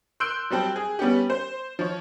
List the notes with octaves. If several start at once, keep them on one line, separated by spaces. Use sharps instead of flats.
C6 E6 F#6 G6 D7
F#3 G3 C4 G5 A5
G#4
G3 B3 C#4 G4
C5
F3 C#5